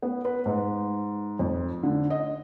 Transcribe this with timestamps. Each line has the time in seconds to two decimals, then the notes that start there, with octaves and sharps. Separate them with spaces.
0.02 B3
0.25 B4
0.46 G#2
1.39 F2
1.83 D3
2.10 D#5